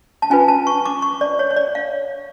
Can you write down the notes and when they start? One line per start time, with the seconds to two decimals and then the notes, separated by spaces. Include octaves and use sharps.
0.22 A5
0.30 C#4 F4 B4 G#5
0.48 A5
0.67 C#6
0.86 D6
1.02 C#6
1.21 D5
1.39 C#5
1.51 C#5
1.57 D5
1.75 F5